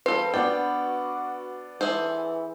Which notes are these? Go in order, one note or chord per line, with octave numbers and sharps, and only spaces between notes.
F3 C4 A4 B4
B3 D4 F#4 D5 G5
E3 G#4 A4 C5